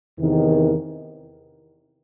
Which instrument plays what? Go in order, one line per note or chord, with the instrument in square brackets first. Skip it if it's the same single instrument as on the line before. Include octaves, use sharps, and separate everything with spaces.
[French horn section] E2 C3 D#3